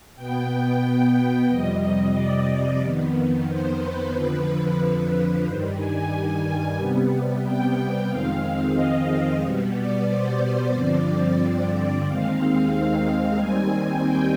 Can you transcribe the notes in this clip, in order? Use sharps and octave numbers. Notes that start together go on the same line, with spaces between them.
B2 B3 G5
F2 C3 G3 D#5
D5
F2 D#3 B3
C5
B4
F2 D3 F3 B4
B4
G2 D#3 G3 C5
G#5
C3 G3 B3
G5
F2 D#3 G#3 C4 F5
D#5
B2 G3 B3
D5
C5
G2 D3 F3 C4 D5
D#2 D#3 G#3 C4 F5
D#2 D#3 G3 C4 G#5
G5